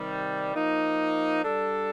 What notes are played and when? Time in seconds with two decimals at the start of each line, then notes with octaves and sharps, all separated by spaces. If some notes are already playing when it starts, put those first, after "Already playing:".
Already playing: C3 D#3 G3
0.55 F3 A#3 D#4
1.44 G3 D4 A4